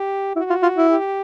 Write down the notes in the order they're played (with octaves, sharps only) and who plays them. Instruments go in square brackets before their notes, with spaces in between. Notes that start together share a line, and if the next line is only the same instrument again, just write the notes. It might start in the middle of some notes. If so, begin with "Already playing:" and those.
Already playing: [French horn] G4
[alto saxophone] E4 [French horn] F#4
[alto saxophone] F4
F4
E4
[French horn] G4